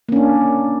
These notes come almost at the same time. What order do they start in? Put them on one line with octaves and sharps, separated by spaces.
A#3 C#4 D4